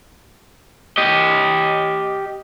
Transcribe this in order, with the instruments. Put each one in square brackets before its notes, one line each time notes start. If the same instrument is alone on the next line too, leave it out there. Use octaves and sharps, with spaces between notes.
[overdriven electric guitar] G4 D#5